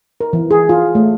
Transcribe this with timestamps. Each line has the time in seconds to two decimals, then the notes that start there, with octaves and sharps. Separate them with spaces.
0.21 A#4
0.33 E3
0.51 G#4
0.69 F4
0.95 A3